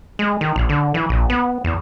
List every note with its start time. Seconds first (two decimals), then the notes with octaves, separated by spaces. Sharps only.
0.19 G#3
0.41 D#3
0.56 A#1
0.69 D3
0.94 E3
1.09 A#1
1.30 B3
1.64 E2